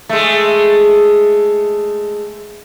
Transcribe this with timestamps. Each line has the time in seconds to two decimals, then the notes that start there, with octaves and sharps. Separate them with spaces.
0.09 G#3 A3